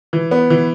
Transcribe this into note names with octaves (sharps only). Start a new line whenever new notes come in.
E3
B3
E3